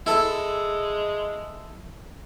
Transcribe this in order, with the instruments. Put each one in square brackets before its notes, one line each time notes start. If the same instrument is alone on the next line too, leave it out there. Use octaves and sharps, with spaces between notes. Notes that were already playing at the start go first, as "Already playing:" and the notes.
[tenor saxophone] G#3 [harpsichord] E4 A4